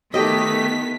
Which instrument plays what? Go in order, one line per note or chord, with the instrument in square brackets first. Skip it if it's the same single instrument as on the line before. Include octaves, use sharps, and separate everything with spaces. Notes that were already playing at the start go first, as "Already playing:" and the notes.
[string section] D#3 B3 B6 [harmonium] A3 [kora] G4 D#5